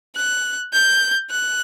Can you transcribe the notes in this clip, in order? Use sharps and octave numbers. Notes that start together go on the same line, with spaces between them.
F#6
G6
F#6